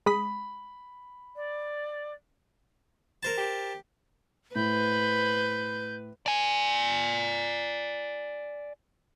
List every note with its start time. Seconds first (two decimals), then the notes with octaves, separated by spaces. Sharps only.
0.06 G#3 B5 D#6 B6
1.36 D5
3.23 A#4 C5 A5
3.37 G4
4.55 A2 B4 C5 B5 G6
6.26 D5 G#5